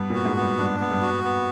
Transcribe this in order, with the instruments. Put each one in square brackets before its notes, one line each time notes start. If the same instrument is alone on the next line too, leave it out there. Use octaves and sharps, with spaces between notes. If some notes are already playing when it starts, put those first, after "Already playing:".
Already playing: [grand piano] G2 [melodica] B3
[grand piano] A#2 [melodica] F#4
[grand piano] G#2
[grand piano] G2 [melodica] B3
[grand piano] G2 [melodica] D4
[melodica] B3
[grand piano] G2
[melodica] F#4
B3